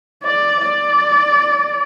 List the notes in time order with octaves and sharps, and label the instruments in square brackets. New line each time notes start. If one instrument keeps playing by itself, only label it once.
[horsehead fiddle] D5
D5